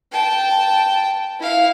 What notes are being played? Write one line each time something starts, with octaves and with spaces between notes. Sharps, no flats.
G5 A5
E4 F5